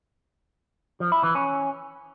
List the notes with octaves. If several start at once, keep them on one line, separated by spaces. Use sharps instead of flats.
F3
E4
E3
C#4